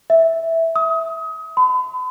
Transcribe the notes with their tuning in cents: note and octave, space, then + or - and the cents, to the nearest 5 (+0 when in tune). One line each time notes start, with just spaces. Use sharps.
E5 -5
D#6 +30
B5 +40